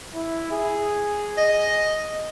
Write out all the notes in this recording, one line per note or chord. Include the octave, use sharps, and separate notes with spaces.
E4
G#4
D#5